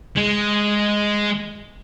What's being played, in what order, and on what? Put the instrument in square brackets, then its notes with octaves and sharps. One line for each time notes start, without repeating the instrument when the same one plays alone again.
[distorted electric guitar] G#3